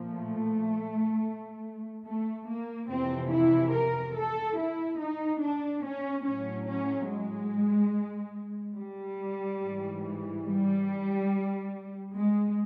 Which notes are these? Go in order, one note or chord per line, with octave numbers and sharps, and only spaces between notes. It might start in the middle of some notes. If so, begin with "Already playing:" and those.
Already playing: A#2 F3
A3
A3
A#3
F2 C3 E3 C4
E4
A#4
A4
E4
D#4
D4
C#4
A2 F#3 C#4
C#4
G#3
G3
G#2 E3
G3
G#3